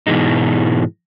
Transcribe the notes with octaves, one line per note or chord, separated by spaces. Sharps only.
G#2 B2 E3 G#3 D#4